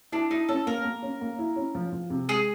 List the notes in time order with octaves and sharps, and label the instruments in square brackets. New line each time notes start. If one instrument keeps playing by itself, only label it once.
[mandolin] D4 [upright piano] E4
[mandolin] D#4 [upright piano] E4
[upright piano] C#4 [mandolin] A4
[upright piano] A#3 [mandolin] A#4
[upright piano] A#3
C#4
A#3
E4
C#4
F3
F3
C3
[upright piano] G#3 [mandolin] G#4